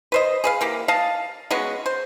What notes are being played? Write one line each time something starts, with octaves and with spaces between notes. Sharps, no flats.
B4 C5 D#5
G#4 B4 F5
E3 A#3 G4
D#5 F5 A5
G#3 B3 C#4 F#4
C5